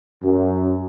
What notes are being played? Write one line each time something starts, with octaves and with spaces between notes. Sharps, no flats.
F#2